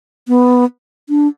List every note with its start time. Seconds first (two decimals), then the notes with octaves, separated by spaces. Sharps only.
0.28 B3
1.09 D4